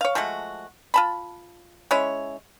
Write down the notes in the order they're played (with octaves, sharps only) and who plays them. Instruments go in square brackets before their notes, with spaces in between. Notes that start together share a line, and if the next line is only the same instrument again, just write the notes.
[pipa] C#5 F5
F3 G#3 A3 F#4
F4 A5 B5
G#3 C#4 E4 C#5